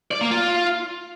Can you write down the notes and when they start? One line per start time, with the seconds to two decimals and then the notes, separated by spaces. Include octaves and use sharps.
0.11 D5
0.21 A#3
0.31 F4